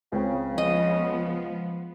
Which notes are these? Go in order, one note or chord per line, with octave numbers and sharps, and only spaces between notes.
C#2 C#3 C4 G5
F3 B3 D#5